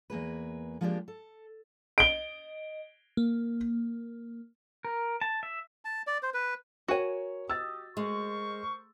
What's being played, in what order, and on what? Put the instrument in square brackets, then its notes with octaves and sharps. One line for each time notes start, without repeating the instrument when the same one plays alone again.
[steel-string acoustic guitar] E2 A#3 G#4 B4
F3 G#3 A#3 D4 G4 D5
A4
[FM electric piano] D#5 [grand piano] D7 G7
[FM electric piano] A#3
[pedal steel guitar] A#4
A5
E5
[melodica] A5
D5
C5
B4
[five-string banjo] F#4 G#5 [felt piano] A#4 C#5
[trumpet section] G4 D#5 [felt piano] E6 A6
[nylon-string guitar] G#3 [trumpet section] A#4 C5 C#6